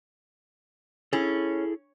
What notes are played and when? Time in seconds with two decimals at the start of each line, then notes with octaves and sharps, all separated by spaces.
1.13 C#4 E4 G#4 A4